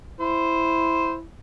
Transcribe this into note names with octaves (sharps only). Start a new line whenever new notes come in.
E4 C5